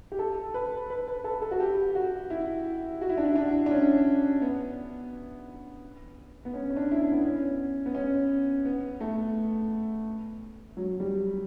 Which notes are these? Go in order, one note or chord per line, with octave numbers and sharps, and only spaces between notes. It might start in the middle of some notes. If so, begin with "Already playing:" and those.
G4
A4
B4
B4
B4
A4
A4
F#4
G4
F#4
E4
F#4
E4
D4
E4
D4
D4
C#4
B3
B3
C#4
C#4
D4
E4
D4
B3
C#4
B3
C#4
B3
A3
F#3
G3